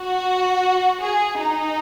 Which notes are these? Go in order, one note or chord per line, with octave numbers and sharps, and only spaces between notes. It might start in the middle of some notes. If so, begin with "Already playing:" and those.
Already playing: F#4
G#4
D#4